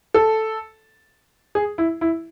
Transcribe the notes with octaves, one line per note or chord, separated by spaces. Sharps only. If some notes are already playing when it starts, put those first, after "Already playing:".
A4
G#4
E4
E4